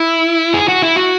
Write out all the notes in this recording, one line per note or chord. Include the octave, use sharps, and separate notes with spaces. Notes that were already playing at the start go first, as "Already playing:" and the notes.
Already playing: E4
G#4
F#4
E4
F#4